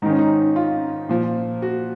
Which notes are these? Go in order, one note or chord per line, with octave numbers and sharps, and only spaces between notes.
G#2 D#3 C#4 D#4
D#4
F4
A#2 F3
F#4